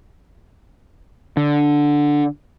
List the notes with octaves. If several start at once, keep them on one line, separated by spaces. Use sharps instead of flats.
D3